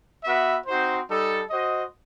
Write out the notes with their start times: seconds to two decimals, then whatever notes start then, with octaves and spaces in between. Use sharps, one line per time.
0.24 B3 F#4 B4 E5
0.67 C4 D#4 F#4 C5
1.09 G3 D#4 A4
1.50 F#4 C5 D#5